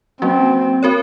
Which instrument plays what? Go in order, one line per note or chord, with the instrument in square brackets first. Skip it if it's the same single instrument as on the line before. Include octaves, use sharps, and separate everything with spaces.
[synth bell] F#3 A#3 C#4 F#4 [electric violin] C4
[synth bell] C4 F#4 A#4 C#5